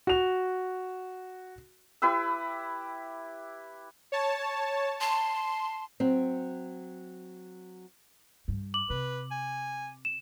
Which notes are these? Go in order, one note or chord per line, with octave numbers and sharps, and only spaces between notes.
F#4 F7
E4 G4 B4 E6
C#5 A5
A5 C6
F#3 C4
G2
D6 F#7
C3 B4
G#5
E7